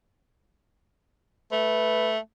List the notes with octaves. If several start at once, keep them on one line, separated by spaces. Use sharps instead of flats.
A3 B4